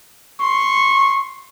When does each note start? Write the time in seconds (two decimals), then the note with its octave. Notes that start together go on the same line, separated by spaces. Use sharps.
0.40 C6 C#6